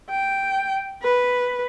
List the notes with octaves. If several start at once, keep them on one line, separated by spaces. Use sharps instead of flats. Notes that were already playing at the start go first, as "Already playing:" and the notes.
G5
B4